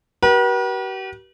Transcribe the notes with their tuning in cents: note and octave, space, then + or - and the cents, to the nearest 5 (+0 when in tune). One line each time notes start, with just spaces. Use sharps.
G4 -45 B4 -45